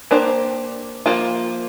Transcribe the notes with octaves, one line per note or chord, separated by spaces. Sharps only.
A#3 D4 G4 C5
F3 A#3 F4